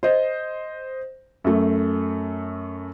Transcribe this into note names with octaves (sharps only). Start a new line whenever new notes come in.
C5 D#5
F#2 A3